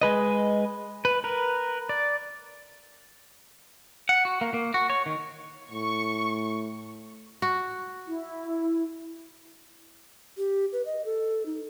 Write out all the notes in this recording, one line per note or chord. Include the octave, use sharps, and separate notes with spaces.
G#3 B4 D#5
B4
A#4 B4
D5
F#5
F#4
A#3
A#3
F#4
C#5
D#3
A2 C#6
F#4
E4
G4
B4
D#5
A4
D#4